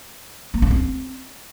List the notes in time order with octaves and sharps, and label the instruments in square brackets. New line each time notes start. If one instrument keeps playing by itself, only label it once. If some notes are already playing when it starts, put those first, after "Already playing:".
[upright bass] A#3
D4
C4